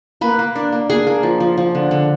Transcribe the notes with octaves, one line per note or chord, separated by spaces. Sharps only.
A#3 B4
A#3
D4
A#3
A#3 G#4
A#3
F3
F3
F3
D3
D3